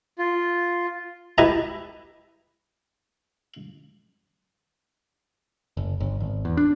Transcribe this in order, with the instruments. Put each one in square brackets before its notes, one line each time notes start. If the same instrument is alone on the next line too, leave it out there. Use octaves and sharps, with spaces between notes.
[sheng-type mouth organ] F4
[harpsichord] E4 G4 B4 D#5 A5 A#5
[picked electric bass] F#1
G1
G#1
E2
D4